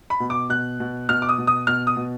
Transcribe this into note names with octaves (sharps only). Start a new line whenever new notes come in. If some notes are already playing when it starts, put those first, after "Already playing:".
B5
B2
D6
B2 F#6
B2
B2 F6
D6
D#6
B2
D#6
B2 F6
D#6
B2